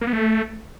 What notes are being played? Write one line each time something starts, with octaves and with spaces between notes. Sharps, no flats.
A#3
B3
A3